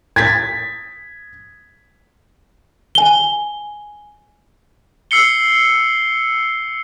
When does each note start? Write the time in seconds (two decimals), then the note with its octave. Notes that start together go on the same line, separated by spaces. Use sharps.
0.16 G#6 A6 B6
2.95 G#5 G7
5.11 E6 C7 C#7 G7